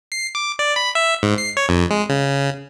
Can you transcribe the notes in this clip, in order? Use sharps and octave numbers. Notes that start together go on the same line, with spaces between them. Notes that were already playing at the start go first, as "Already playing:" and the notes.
C7
D6
D5
B5
E5
G#2
C7
C#5
F2
G#3
C#3